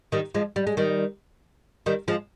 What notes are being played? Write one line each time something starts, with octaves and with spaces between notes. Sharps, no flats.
D#3 G3
F3 G#3
G3
G#3
D#3 G3
D#3 G3
F3 G#3